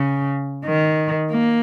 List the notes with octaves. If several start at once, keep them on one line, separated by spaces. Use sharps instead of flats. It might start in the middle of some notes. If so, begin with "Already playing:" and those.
Already playing: C#3
D#3
A#3